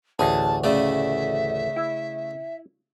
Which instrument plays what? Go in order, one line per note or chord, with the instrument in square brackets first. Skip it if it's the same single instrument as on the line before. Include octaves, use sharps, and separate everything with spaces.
[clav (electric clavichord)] A1 D2 [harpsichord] G#4 [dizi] A5
[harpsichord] C#3 A3 D5 [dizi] E5
[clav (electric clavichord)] E4